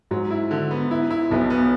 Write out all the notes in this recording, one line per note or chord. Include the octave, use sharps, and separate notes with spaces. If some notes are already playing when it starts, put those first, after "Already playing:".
G#2 F#3
E4
D3
B3
E4
E4
B1 B2 B3
B3